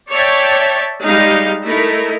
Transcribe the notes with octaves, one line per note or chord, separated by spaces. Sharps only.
C#5 D5 E5 G5 A5
G3 G#3 D#4 D#5 F5
A3 D#4 E4 A#4